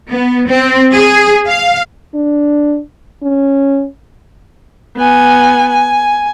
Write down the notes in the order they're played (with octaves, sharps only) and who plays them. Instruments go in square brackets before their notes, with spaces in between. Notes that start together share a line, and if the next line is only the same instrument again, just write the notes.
[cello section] B3
C4
G#4
F5
[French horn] D4
C#4
[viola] B3 G#5
G#5